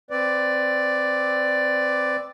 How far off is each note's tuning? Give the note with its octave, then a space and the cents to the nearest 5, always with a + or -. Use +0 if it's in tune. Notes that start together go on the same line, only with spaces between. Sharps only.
C4 +0 B4 +20 D5 +0